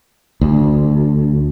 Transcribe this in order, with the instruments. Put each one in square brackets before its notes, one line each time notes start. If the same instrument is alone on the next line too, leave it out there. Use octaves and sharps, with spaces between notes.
[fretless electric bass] D2